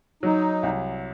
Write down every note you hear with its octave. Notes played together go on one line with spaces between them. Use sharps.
F#3 D#4
C2